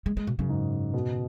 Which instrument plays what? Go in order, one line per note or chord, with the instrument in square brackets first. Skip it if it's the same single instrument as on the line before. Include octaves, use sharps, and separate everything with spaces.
[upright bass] G#3
G#3
B2
[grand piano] F#2 [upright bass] C#3
[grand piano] G#2
B2